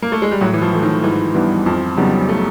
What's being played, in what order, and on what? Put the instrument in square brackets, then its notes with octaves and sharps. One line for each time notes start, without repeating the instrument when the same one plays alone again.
[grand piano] A#3
A3
G#3
G3
[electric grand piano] A2 [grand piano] F#3
[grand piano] E3
F3
[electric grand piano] E3 A3
[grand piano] D#3
[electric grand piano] G#2 [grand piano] E3
[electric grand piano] E3 G3 B3 D4
[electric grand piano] F2 [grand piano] F3
[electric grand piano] C#3 F#3 B3 D#4 [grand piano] G3
[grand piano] A3